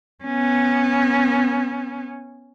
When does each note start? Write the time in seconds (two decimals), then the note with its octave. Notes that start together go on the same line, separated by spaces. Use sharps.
0.24 B3 C#4